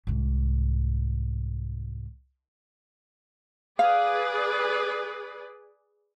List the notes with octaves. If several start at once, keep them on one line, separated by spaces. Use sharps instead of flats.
C2 G#2
G#4 B4 D5 F5